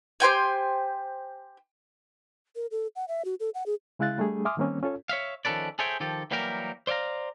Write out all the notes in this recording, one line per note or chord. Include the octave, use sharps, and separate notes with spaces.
G4 C5 G5 G#5
A#4
A4
F#5
E5
F#4
A4
F#5
G#4
C#3 G#3 E4 F5 F#6 A6
G3 A3 D4 G#4
E5 G#5 C6 D6 D#6 F6
D#3 G3 A#3 C4 C#4
C#4 F4 A4 C#5
C#5 E5 F5
D#3 F3 C#4 A4 B4 D5
G#4 A4 C5 C#5 E5 G5
D#3 F3 G4 A4
E3 F#3 G3 A#3 G4 A#4
C5 D5 E5 F5 A#5